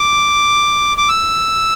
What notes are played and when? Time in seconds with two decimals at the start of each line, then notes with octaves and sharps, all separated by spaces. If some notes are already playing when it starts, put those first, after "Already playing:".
Already playing: D6
0.97 D6
1.09 E6